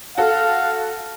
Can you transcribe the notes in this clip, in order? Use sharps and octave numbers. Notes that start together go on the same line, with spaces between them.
F#4 A4 F5